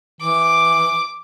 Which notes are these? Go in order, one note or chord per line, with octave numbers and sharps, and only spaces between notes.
E3 D6